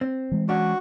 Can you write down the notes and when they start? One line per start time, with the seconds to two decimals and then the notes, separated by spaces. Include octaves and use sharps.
0.01 C4
0.32 E3 G#3
0.49 C#4 D4 F#4 C#6